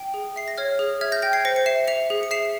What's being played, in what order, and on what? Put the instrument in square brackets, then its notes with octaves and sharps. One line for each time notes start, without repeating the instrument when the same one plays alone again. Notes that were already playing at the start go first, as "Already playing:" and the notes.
Already playing: [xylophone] G5
G#4
E5 C7
A#6
C#5 F6 G#6
G#4
E5 F6 G#6
G6 A#6
G5 G6 A#6
G#6 C7
C5 A#6 C#7
C#7
E5 C7 E7
E5 C#7 F7
G#4
C#7
E5 C7 E7